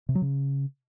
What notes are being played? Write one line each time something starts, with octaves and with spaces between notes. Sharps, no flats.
C3
F#3
C#3